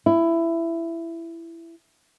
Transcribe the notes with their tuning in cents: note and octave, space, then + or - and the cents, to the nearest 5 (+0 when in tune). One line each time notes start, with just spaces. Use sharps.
E4 +15